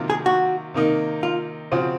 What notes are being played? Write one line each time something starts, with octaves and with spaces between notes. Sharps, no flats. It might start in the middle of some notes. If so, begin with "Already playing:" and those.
Already playing: C3 D#3 F#3 A#3 F4
G#4
F#4
C3 D#3 A#3 D#4
F4
C#3 F3 C4 F#4